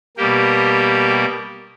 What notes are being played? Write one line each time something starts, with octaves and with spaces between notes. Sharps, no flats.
B2 G3 A#3 G4